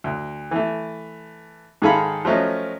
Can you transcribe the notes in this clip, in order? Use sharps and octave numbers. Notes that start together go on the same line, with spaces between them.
D2
E3 A3
G#2 D#3 G#4 A4 F5 B5
F3 F#3 A3 C#4 D#5